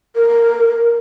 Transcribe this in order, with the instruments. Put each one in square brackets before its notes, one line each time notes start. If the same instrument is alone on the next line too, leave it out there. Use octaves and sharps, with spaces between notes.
[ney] A#4